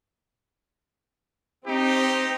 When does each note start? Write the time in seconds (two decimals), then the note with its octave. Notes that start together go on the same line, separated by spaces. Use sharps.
1.67 C4 D#4 G4